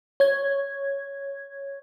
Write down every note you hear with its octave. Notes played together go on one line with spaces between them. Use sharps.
C#5 G#6